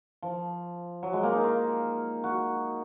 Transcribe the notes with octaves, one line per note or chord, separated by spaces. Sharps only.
F3
F#3
G#3
A#3
D#4
F4
F#4